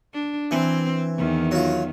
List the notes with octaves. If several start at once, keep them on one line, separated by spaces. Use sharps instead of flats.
D4
E3 C4
E2 D#3
F#3 F4